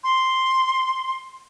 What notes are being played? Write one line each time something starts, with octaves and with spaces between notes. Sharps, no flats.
C6